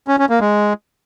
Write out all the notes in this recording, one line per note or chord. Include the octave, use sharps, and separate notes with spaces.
C#4
C#4
A#3
G#3